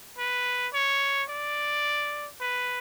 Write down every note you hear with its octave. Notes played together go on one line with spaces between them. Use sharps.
B4
C#5
D5
B4